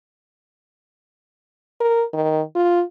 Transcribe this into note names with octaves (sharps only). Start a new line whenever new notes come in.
A#4
D#3
F4